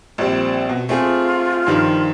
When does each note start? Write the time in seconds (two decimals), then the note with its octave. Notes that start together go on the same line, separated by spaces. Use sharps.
0.18 A#1 G3 C4
0.69 B2
0.89 A3 C4 F4 G#4
1.67 G2 D#3 F3